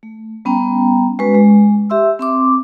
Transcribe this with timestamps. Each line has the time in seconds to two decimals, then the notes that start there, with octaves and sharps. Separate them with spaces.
0.03 A3
0.45 G3 B3 C#4 G5 A#5
1.19 G#3 C#4 F#4 B4
1.35 G#3
1.90 G4 E5 C6 E6
2.19 C4 C6 D6